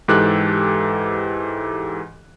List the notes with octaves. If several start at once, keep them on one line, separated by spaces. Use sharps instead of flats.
G#2 E3 G4 A4 F#6